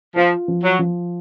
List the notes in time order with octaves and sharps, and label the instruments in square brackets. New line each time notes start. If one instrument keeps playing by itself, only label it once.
[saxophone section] F3 [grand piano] F4
[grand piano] F3
[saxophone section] F#3
[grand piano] F3